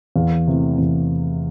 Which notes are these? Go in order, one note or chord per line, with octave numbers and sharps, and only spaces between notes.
E2 F5
C3 E3 A3 E4
E2